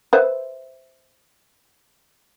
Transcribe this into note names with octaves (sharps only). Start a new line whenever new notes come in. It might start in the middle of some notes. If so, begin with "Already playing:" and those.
B4 C5 E5